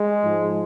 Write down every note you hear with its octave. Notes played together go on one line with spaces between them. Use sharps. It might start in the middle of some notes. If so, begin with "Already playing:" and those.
Already playing: G#3
G#2 F3